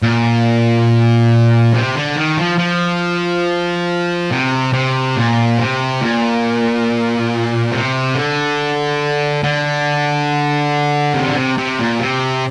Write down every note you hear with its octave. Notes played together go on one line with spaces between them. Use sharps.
A#2
C3
D3
D#3
F3
F3
C3
C3
A#2
C3
A#2
C3
D3
D3
C3
D3
C3
C3
A#2
C3